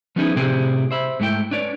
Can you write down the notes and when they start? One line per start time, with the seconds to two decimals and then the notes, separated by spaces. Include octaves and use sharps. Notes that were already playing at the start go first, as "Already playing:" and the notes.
0.16 F3 B3 C#4 D#4 E4 G#4
0.36 A2 C3 C4 E4 G4 G#4
0.91 C5 E5 B5
1.20 G#2 A3 E4 G5
1.51 D4 B4 C#5 D5